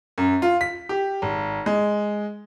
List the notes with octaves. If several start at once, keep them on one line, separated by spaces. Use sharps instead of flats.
F#2
F4
B6
G4
G#1
G#3